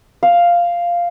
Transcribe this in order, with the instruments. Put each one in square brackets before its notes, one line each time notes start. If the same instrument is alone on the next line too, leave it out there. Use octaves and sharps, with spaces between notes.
[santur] F5